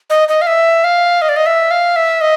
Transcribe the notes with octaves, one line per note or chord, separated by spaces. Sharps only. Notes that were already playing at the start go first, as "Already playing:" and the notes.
D#5
D#5
F5
E5
F5
D#5
D5
D#5
E5
F5
E5
D#5